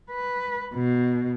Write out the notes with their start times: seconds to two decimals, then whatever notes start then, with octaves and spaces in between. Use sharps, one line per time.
0.11 B4
0.75 B2